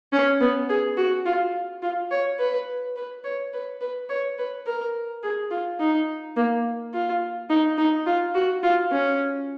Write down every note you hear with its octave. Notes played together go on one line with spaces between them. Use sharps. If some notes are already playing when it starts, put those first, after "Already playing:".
C#4
B3
G#4
F#4
F4
F4
C#5
B4
B4
C#5
B4
B4
C#5
B4
A#4
G#4
F4
D#4
A#3
F4
D#4
D#4
F4
F#4
F4
C#4